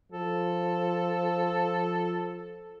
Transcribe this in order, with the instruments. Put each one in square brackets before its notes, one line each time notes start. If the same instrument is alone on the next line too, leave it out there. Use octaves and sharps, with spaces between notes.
[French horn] F3 [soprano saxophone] A4